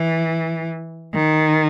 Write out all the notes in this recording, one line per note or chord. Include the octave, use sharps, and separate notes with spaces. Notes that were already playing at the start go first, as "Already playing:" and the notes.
Already playing: E3
D#3